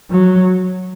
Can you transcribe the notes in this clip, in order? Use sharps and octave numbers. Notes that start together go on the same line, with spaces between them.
F#3